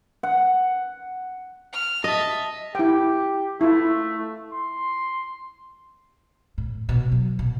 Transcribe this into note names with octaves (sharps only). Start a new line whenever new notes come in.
F#5
F6
D#5 E5 A5
E4 G4 G5
A3 E4 F4
C6
A2
B2
F#3
B2